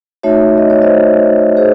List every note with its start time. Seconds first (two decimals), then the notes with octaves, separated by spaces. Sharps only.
0.23 A3 D#4 F#4 C#5 E5
0.58 D#5
0.70 C#5
0.82 C5 D#5
1.57 G#4 C5